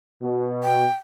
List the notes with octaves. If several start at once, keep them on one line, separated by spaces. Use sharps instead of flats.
B2
G5